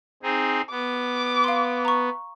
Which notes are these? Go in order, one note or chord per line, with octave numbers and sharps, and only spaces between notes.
C4 D#4 G#4
B3 D6
F5 C6
A#5 C#6